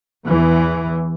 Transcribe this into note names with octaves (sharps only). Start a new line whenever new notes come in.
E2 E3